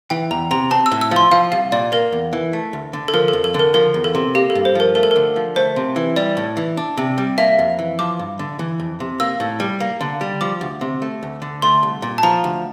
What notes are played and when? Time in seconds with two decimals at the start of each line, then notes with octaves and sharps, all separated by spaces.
0.10 E3 G5
0.31 E2 A#5
0.51 C3 A#5
0.71 C4 A5
0.86 E6
0.91 A2
1.01 E6
1.11 F3 C6
1.31 F3 F5
1.52 C2 F5
1.72 A#2 D5
1.92 A#3 A#4
2.12 E2
2.33 E3
2.53 A3
2.73 D2
2.93 D3
3.08 A4
3.13 F3 A#4
3.28 F2 A4
3.44 A4
3.54 D3
3.59 A#4
3.74 F3 A#4
3.94 E2
4.04 A4
4.15 C3
4.35 A#3 G4
4.50 A4
4.55 G2
4.65 C5
4.75 F3 A#4
4.95 A3 A#4
5.03 A4
5.11 D3 A#4
5.36 F3
5.56 A3 C5
5.76 C3
5.96 E3
6.16 G3 D5
6.37 A2
6.57 E3
6.77 D4
6.97 C3
7.18 G3
7.38 A#3 E5
7.59 F2
7.79 E3
7.99 F3 D6
8.19 G2
8.39 D3
8.59 E3
8.80 F2
9.00 C3
9.20 A#3 E6
9.40 A2
9.60 G3
9.80 A#3
10.01 D3
10.21 G3
10.41 F3 D6
10.61 D2
10.81 C3
11.02 A3
11.23 D2
11.42 D3
11.62 A3 C6
11.83 C2
12.02 A#2
12.18 A5
12.23 F3 A#5
12.44 D2